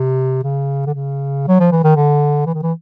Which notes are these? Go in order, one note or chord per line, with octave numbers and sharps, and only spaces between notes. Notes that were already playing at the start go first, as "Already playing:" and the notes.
Already playing: C3
C#3
D3
C#3
F#3
F3
E3
D#3
D3
E3
D#3
E3